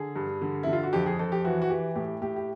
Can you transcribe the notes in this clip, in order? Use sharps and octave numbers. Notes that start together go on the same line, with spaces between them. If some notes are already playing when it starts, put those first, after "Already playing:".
Already playing: D3 G#4
G2
D3
D3 E4
F4
F#4
F2 G4
G#4
F2 A4
G4
E3 F#4
F#4
E3 G4
A2 G4
A2 G4
G4